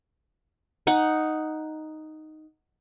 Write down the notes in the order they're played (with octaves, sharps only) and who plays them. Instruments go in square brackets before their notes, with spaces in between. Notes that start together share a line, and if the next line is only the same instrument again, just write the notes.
[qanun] D#4 F#5